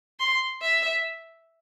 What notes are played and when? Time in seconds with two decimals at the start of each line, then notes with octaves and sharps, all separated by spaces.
0.20 C6
0.62 E5